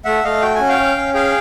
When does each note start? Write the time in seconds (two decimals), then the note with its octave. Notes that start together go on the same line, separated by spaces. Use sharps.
0.05 A3 E5 F#5
0.24 A3 D#5 F5
0.41 F#4 G5
0.55 C#4 G#5
0.69 F5 G5
0.78 C#4
0.97 C#4
1.14 G#4 F5 G5